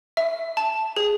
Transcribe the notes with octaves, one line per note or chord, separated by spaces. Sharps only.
E5
A5
G#4